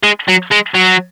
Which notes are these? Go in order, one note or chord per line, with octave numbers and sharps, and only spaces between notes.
G#3
F#3
G#3
F#3